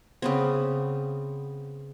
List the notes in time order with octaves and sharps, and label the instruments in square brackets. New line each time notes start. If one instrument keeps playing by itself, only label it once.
[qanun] C#3 B3 C4